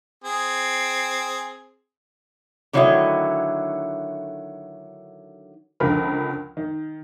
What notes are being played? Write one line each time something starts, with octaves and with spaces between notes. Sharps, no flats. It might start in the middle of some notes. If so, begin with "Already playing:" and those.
C4 G#4
D3 D#3 F#3 A3 E4 D#5
C#2 D3 F3 A#4 B5 F6
D#3